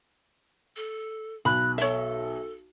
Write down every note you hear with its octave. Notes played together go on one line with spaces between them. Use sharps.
A4
B1 B5 F#6
A4 C#5 E5